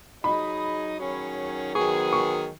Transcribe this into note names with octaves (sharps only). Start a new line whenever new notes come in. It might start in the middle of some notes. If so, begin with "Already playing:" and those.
F#3 D#4 G#4 D#5 B5
D#3 F#3 C#4 G#4 C#5
D#3 F#3 B3 G#4 C#6
C#6